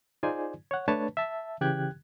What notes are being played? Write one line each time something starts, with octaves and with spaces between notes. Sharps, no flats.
D#4 F4 G#4 C5 D5 G#5
C#5 F#5
A3 D4 B4 C#5 A5
E5 A5
C#3 E3 G4 G5 F#6 G#6